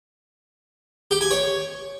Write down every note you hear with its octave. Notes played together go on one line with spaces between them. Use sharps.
G4
G#5
C#5